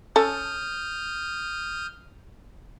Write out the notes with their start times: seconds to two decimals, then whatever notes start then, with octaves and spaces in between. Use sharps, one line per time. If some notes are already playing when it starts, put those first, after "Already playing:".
0.16 C#4 A4 D#6 F6 G6